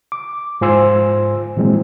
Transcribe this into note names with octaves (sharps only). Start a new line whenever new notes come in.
D6
G#2 F4 C5 G#5 C6 E6
A#2 E3 F#3 G#3 C4